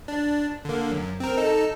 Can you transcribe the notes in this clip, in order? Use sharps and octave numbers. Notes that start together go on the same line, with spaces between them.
D4
D3 A#3
F#2
C4 A#4
D#4 A4